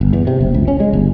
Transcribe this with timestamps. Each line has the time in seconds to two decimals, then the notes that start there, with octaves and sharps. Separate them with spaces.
0.01 G1
0.13 E2
0.27 C3
0.41 F#1
0.54 C#2
0.68 C#4
0.80 G#3
0.93 G1